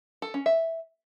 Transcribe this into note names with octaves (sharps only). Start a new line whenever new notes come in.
A4
C#4
E5